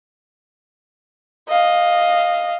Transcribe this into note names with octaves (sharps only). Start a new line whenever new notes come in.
D#5 F5